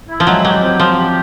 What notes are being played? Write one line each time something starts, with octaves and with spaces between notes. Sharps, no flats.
E4
F3
F#3 G#3
F#3 G4
C4
F3 C4
G4